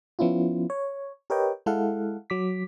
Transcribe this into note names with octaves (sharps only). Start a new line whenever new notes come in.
F3 B3 C#4 E4 F4
C#5
G4 A#4 B4 C#5 D#5 G5
G#3 E4 A4 F5 F#5
F#3 D6 B6